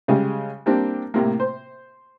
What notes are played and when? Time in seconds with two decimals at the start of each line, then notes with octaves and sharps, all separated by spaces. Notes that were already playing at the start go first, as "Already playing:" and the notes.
0.08 C#3 G3 G#3
0.66 G3 A#3 C4 D4 G4
1.14 A2 C3 A#3
1.40 C5